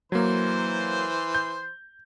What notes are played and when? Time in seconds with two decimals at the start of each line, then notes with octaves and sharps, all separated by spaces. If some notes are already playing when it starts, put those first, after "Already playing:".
0.12 E3 F#3 A#3 C5 C6
1.34 G6